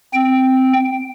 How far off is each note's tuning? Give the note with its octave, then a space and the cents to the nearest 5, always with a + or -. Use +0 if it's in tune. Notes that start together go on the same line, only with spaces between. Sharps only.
C4 -5 G5 +0